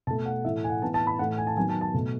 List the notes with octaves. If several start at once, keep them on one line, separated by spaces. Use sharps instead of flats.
B2 A3 A5
F#5
A2 E3 A3 E5
G#5
F#5
A2 E3 B3 A5
A5
B5
A2 E3 A3 F#5
G#5
A5
D#3 F#3 B3 G#5
A5
A5
B2 A3